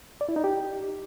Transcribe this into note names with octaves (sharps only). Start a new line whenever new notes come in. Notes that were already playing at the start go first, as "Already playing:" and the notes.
D5
E4
D#4
G4